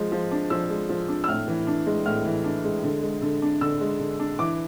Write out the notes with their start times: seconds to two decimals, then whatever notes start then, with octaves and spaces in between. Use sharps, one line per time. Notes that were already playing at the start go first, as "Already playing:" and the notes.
Already playing: F3 G#3
0.12 F3
0.32 D4
0.50 F3 E6
0.70 G#3
0.89 F3
1.08 D4
1.24 E6
1.28 A2 F6
1.48 E3
1.67 D4
1.87 G#3
2.06 A2 F6
2.26 E3
2.44 D4
2.64 G#3
2.83 D3
3.03 G#3
3.22 D3
3.42 D4
3.61 D3 E6
3.81 G#3
4.00 D3
4.20 D4
4.39 E3 D6